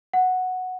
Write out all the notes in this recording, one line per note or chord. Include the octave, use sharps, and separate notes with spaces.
F#5